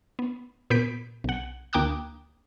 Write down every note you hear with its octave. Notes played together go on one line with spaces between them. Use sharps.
B3
A#2 B3 G6 B6 D7
B1 F#5
D2 A#3 G5 D6 D#6 F#6